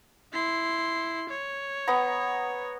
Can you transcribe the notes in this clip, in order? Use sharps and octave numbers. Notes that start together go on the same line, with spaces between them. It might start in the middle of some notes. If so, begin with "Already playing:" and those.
E4 C6
C#5
B3 A#5